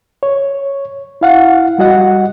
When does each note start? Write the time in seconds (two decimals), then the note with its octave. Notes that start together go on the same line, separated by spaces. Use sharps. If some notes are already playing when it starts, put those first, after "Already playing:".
0.23 C#5
1.21 E4 F5 F#5
1.78 G3 F#4 D#5 F#5